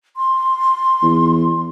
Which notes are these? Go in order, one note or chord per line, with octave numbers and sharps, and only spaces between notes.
C6
E2